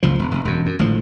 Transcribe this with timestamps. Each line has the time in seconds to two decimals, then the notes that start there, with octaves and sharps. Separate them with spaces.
0.03 F#1 C#2 F3
0.19 E1
0.31 F1
0.45 E1 F#2
0.66 F#2
0.79 G#1 A2 D3 F3